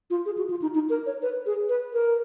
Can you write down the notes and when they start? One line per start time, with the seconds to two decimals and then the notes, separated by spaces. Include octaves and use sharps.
0.10 F4
0.26 G#4
0.37 F#4
0.50 F4
0.62 D#4
0.75 D#4
0.90 A#4
1.06 C#5
1.22 B4
1.46 G#4
1.69 B4
1.93 A#4